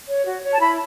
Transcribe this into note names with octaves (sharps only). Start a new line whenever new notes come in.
C#5
F#4
C#5
A5
E4 B5